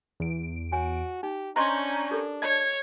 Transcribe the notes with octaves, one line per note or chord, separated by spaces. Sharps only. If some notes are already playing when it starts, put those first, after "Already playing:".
E2 D7
F#4 C#5 G#5
D#4 G4
C#4 D4 C5 D#5 A#5 C6 C#6 G6
G4 A4 A#4
C#5 D#5 A5 G#6